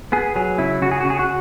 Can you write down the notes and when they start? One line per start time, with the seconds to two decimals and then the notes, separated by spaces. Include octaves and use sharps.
0.12 B3 G#4
0.36 F#3 G#4
0.58 C#3 E4
0.82 C#3 F#4
0.91 G#4
1.00 F#4
1.05 C#3
1.10 G#4
1.19 F#4